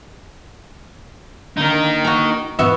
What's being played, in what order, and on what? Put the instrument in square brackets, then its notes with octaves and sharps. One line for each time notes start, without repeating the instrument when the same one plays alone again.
[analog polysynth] D3 A#3 [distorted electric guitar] D#4 A#4
[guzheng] F#4 A#5
[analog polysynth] E2 G#2 B2 [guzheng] B3 F#4 E5